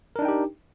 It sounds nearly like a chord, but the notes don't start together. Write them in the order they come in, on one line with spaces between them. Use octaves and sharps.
A#4 D4 D#4 G5 G4